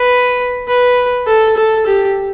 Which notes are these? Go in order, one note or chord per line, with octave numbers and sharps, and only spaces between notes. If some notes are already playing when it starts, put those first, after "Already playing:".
Already playing: B4
B4
A4
A4
G4